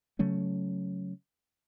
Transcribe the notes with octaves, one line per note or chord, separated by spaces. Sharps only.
C#3 F#3 A3 C#4